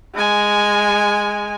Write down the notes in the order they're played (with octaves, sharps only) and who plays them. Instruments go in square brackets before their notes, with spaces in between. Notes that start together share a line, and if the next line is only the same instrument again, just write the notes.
[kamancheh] G#3 G#5